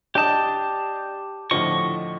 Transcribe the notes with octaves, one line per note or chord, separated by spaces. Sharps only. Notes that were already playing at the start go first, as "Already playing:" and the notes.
D4 G4 D#5 A5 D6
A2 D3 F3 D#5 C#6